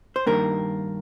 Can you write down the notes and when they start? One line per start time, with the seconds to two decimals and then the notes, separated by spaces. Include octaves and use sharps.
0.16 C5
0.26 G2 D#3 A#3 D4 A#4